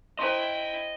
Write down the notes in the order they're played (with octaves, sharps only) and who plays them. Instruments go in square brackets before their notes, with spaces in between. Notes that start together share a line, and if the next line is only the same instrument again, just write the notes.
[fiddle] E4 G5 [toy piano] C5 A#5 C6 [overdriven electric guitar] D#5